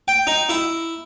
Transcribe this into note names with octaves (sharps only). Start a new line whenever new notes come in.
G5
D#4
E4